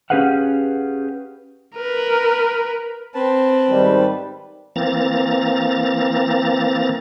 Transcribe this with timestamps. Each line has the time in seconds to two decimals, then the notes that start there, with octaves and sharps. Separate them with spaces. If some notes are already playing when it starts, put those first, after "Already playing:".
0.10 C#4 G4 G#4 B4 F5 F#5
1.76 A#4 B4
3.14 C4 B4 A5
3.69 G#2 D#3 G3
4.76 E3 A#3 C4 A#5 A6